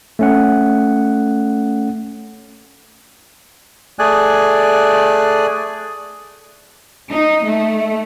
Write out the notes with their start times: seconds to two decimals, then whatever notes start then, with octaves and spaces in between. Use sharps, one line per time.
0.19 A3 C#4 F#5
3.99 A3 G#4 D5 G#5 F#6
7.11 D#4
7.45 A3